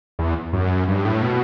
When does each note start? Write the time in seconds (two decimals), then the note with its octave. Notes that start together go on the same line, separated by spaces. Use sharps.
0.19 E2
0.53 F#2
0.88 G2
1.05 A2
1.22 B2